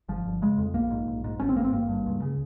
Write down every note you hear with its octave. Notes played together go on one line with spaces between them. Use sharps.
G1 F3
G1
C#3 G#3
F2
A#1 A#3
G#2
A#1
G#2
G#1 C#4
C4
G2 A#3
C4
G#1 A#3
G2
C#2
C#3